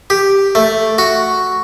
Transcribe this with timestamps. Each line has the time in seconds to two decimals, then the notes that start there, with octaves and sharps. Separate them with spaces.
0.10 G4
0.55 A3
0.98 F#4